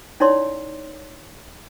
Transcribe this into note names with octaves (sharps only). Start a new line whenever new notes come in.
C#4 D#4 E4 C#5 D5 C6